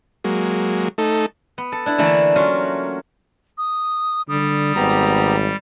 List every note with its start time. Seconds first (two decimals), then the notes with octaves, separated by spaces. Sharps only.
0.24 F#3 G#3 A#3
0.98 A3 D#4 A4
1.58 B3
1.72 A4
1.86 D4 E4
1.98 D3 E3 A3 A#3 D4
2.36 F#3 C#4 F4 F#4
3.58 D#6
4.29 D3 G3 D#6
4.76 G#1 B3 G4 A#5